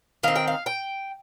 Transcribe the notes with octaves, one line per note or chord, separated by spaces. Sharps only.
D#3 C4 F5
G5
F5
G5